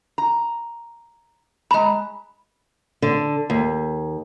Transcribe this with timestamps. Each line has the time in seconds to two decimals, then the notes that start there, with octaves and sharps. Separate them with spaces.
0.18 A#5
1.71 G#3 A#5 B5
3.02 D3
3.50 D#2